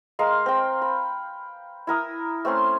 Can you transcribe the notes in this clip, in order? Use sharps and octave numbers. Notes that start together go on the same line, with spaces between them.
G#3 A#4 F5 C6
C4 G5
B5
E4 A#4 D#6
A3 C4 C#4 C6